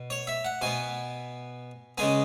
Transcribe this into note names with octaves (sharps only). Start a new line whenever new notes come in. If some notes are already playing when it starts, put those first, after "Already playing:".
Already playing: B2
C#5
E5
F#5
B2 B3 G#5
C#3 G#3 B3 G#5